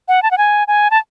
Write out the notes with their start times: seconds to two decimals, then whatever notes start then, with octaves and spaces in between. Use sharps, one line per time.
0.08 F#5
0.23 A5
0.31 F#5
0.38 G#5
0.68 G#5
0.91 A5